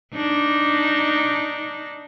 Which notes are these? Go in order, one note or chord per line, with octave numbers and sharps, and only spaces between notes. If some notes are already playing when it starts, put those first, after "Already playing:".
D4 D#4